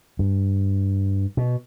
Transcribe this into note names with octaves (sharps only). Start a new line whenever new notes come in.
G2
B2